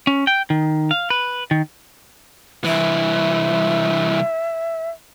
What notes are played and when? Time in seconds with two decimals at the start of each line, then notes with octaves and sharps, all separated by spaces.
0.07 C#4
0.27 G5
0.50 D#3
0.91 F5
1.10 B4
1.51 D#3
2.64 C2 E3 E5